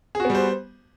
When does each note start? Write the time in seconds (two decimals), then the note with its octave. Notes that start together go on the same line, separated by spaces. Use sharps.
0.15 G#4
0.20 F#4
0.25 B3
0.30 G3
0.35 C5